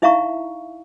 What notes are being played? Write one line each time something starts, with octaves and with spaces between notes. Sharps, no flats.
D#4 E4 E5 F5 A#5 C#6